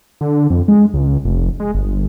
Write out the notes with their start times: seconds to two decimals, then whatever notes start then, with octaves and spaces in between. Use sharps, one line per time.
0.21 D3
0.50 F2
0.68 G#3
0.94 C#2
1.25 F1
1.60 G#3
1.74 G1